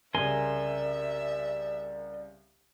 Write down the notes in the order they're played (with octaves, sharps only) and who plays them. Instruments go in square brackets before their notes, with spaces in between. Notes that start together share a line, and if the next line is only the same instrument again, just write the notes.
[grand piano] C2 C#3 [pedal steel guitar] A#4 G#5 C6 [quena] D5 [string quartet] E5